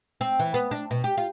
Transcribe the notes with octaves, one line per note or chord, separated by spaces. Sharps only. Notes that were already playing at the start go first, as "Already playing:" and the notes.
C4
E3
B3
D4
B2
G4
F4